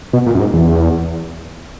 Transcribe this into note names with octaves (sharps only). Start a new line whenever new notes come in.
B2
A#2
F#2
G#2
E2